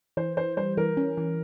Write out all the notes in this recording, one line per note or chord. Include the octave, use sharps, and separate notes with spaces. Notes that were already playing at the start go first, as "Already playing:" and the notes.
E3 C5
E3 C5
G3 C5
E3 A#4
C#4
E3